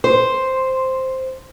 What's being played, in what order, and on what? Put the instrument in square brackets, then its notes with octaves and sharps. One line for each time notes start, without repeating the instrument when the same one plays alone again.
[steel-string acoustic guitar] C5